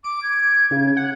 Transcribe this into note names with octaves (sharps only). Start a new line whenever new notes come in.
D6 D7
G#6
C#3
F#5